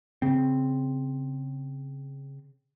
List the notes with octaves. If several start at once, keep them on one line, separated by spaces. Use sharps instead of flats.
C#3 C4